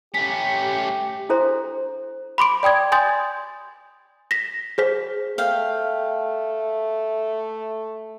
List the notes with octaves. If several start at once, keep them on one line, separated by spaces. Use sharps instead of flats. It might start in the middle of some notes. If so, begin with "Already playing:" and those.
A3 C#4 G4 B6
D4 E4 A4 C5 A#5 C6
B5 C6 D6 D7
D5 G5 D#6 G#6
G#5 C6 D#6 G6 A6
A#6 B6
G#4 C5 B6
A3 F5 G5